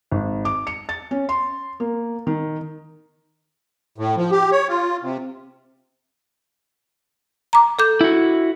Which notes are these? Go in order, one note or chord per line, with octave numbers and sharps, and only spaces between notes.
G#1
D6
C#7
A6
C#4
C6
A#3
D#3
A2
F3
G4
C#5
F4
C3
A#5 D6
A4 D6 G6
E4 F#4